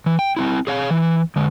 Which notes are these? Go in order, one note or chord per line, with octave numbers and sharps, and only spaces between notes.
E3
G5
C4 C#4 E4
G#4 C#5 F5
E3
D3 G#3